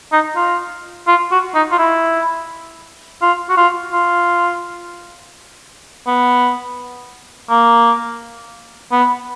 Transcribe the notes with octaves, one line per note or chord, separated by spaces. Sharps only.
D#4
F4
F4
F#4
D#4
F4
E4
F4
F#4
F4
F4
B3
A#3
B3